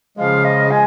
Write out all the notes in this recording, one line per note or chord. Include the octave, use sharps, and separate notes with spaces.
C#3 F3 G#3 F5
D#5
G#3 G#5